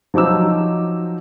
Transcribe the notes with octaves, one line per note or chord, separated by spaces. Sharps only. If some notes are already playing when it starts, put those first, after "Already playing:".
F3 F#3 D#4 D6 E6